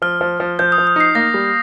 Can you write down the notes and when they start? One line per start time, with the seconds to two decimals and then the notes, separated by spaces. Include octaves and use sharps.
0.02 F3 F6
0.21 F3
0.40 F3
0.59 F3 G6
0.72 D#6
0.78 F3
0.87 D#6
0.96 D#4 C7
1.15 A#3 A#6
1.34 G3